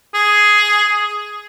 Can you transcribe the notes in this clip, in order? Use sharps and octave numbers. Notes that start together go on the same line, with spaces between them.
G#4